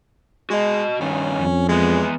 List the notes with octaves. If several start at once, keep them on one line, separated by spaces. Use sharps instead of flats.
G#3 F#4 D#5
G2 D#3 C#4 D#4
F2
E2 G#3 B3